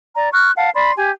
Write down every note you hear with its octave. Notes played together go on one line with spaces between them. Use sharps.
D5 A#5
C#6 F6 F#6
F5 F#5 A5
D5 B5 C6
G4 G#5